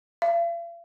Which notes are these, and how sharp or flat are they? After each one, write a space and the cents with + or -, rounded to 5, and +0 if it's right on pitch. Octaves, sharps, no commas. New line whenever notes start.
F5 -45